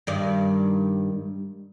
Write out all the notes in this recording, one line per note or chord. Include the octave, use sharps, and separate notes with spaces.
G2 D#3 D5